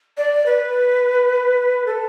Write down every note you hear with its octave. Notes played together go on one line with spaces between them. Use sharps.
D5
B4
A4